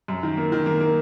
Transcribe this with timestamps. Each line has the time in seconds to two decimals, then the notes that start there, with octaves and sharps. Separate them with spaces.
0.08 F#2
0.23 D#3
0.37 A#3
0.52 D#3
0.66 A#3
0.80 A#3